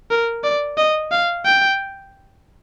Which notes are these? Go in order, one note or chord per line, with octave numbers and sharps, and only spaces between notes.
A#4
D5
D#5
F5
G5